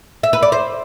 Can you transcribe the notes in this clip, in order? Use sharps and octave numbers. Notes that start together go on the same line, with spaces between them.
E5
B4
D5
C5